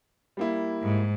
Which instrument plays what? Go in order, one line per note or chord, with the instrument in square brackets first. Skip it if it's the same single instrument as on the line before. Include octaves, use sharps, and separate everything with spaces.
[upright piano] G3 A#3 E4
[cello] G#2